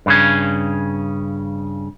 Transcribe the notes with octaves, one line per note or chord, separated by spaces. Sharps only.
G2 C#3 C#4